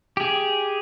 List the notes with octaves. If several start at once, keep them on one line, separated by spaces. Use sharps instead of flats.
G4 G#4